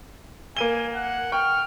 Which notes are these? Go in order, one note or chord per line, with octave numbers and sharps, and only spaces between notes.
A#3 G#5 D#7 G7
F#5
G5 C#6 F6